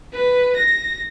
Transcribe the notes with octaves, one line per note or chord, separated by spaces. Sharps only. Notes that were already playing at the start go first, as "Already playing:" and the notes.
B4
A#6